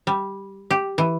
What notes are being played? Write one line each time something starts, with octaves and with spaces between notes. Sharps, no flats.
G3
G4
E3